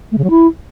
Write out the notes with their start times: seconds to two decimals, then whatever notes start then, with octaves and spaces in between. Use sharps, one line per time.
0.12 A3
0.18 C#3
0.24 F#3
0.30 E4